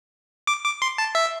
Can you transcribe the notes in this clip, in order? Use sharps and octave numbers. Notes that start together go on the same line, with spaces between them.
D6
D6
C6
A5
E5